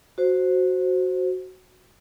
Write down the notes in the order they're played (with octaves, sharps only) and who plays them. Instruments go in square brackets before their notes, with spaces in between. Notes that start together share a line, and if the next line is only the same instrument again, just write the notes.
[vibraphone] F#4 C5